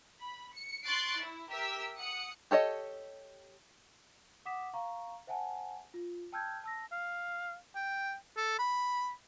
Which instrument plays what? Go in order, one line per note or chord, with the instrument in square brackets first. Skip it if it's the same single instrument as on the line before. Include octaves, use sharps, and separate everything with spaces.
[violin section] B5
C#7
C6 C#6 F#6 A6 C7 D7
E4
G4 A#4 E5 E6 B6
F#5 D#6 C#7
[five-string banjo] G4 A4 C#5 D#5
[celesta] F#5 D6 D#6 B6 E7
F5 A#5 C#6
C5 E5 F#5 G#5 A5
F4
G5 A5 E6 F6 G6 G#6
A5 E6 A#6
[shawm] F5
G5
A4
B5